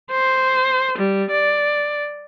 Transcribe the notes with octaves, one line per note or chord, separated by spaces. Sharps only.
C5
G3
D5